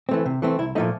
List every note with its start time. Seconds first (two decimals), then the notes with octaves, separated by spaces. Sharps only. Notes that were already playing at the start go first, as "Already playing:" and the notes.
0.09 E3 A3 C4
0.26 C3
0.42 E3 A3 C4
0.59 C2 E4
0.75 A#2 F3 A3 D#4